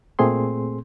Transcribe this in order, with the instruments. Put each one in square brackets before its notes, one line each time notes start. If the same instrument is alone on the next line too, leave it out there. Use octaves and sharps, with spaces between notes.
[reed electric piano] A#2 A3 C4 G#4 C6